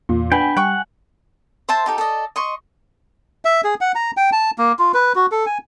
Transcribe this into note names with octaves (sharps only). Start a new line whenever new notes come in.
E2 A#2
B3 D4 G5 G#5 B5
G3 F#5 G5 C#6
C5 E5 A5 C6
D#4 G4 A4
A4 D5 D#5
D#5 C6 C#6
E5
G#4
F#5
A#5
G5
A5
A#3
F4
B4
F#4
A4
G#5